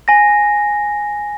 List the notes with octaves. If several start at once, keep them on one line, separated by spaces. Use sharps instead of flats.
G#5 A#6